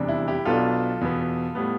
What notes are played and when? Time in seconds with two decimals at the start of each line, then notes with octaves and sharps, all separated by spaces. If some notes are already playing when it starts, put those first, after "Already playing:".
Already playing: F1 E2 C3 G3 D4
0.09 E4
0.28 E4 G4
0.45 B1 B2 B3 D4 F4 A4
1.01 E2 B2 B3
1.55 A2 G3 B3